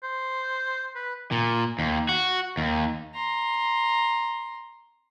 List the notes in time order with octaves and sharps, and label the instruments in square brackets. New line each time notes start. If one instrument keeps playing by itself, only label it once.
[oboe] C5
B4
[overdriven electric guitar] A#2
D#2
F#4
D#2
[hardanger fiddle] A#5 C6